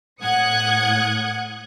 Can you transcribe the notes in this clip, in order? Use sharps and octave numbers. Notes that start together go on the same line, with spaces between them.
A2 F#5 D#6 F#6 G#6 C#7